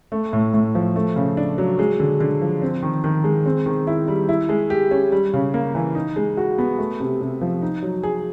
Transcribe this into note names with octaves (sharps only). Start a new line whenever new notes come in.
A3
A2
A2
F3
A3
C#3
D4
F#3
G#3
D3
D3
F3
C4
D#3
D#3
G#3
C4
D#3
E4
G3
E4
G#3
G4
C#4
G3
C#3
A#3
E3
D#4
G#3
F#4
B3
A3
C3
C3
F3
D#4
F#3
G#4